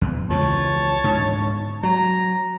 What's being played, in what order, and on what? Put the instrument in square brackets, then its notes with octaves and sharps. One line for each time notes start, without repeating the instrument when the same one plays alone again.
[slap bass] E2
[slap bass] C#2 E3 F3 [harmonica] C#5 A5
[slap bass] G#2 D3
[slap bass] F#3 [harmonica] A#5